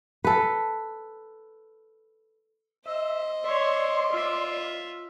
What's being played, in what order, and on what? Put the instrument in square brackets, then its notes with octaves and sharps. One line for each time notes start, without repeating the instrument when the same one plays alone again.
[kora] A4 B4
[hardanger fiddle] C5 D#5 [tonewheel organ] E5
[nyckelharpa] C#5 E5 [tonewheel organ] D5 C6
[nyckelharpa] F4 E5